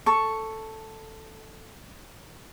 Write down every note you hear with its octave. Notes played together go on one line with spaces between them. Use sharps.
A4 C#6